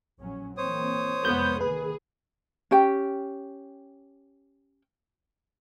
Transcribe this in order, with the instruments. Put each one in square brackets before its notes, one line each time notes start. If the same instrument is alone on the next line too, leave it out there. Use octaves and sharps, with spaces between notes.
[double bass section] A#1 F#3 C#4
[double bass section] E3 A#3 C4 [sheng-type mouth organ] C5 C#5 D#6
[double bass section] C2 F2 G#3 [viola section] B3 [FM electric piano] G6
[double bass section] D#3 A#3 [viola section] G#4 [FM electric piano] B4
[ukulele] C#4 G4 G5